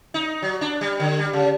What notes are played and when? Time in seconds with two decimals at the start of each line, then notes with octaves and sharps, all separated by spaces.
0.14 D#4
0.42 F#3
0.61 D4
0.81 G3
1.00 D3
1.19 G3
1.33 C#3